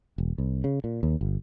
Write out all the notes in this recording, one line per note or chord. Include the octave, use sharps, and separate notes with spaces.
E1
C2
C#3
A#2
D#2
G1